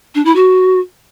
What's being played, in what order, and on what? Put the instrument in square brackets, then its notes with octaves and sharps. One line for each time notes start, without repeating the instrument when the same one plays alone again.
[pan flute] D4
E4
F#4